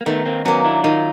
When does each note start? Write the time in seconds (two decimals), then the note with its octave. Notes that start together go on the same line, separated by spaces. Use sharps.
0.01 A#3
0.06 D#3 A3 B3
0.26 A#3 C4
0.45 F#3 A#3 B3 C#4
0.64 D4 E4
0.84 D#3 D#4 F4